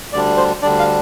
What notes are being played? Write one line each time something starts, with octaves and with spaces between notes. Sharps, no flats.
D2 D3 G3 D4 D5
C5
D2 D3 G3 D4 D5
F5